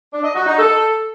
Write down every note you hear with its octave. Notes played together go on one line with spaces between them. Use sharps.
D4
D#5
F#4
D#4
A4